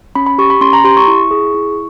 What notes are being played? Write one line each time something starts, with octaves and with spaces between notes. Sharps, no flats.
C#4 B5
B5
G4 C#6
B5
C#4 C6
A#5
G4 C6
C#6
E4
G#4
E4